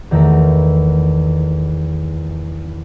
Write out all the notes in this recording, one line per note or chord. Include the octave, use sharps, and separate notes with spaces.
E2 D#3 A3 E4 A4 A#4